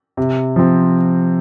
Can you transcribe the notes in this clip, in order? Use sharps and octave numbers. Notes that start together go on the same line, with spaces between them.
C3
F3 C4